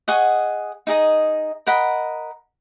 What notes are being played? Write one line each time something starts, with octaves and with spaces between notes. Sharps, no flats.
G#4 D#5 F#5 C#6
D#4 G#4 D#5
A#4 D#5 F#5 B5